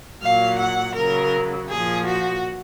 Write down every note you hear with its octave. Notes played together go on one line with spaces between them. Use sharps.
A#2 F#3 F5
F#5
C#3 F#3 A#4
A#2 F3 G#4
F#4